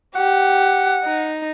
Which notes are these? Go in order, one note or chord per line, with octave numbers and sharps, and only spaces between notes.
G4 F#5
D#4